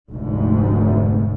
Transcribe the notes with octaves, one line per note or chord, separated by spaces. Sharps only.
F1 D2 G#2